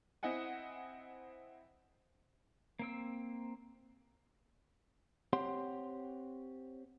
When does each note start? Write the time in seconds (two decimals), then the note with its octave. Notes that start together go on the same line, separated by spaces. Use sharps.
0.23 C4 E4 D#5 F#5 G#5
2.79 A#3 C4 E6
5.33 C4 G4 C#5 F#5 C6